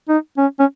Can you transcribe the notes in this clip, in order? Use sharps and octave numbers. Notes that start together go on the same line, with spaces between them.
D#4
C#4
C#4